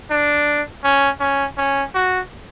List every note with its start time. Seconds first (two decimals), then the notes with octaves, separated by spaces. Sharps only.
0.10 D4
0.84 C#4
1.20 C#4
1.57 C#4
1.94 F#4